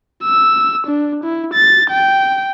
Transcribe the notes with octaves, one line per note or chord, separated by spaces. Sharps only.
E6
D4
E4
A6
G5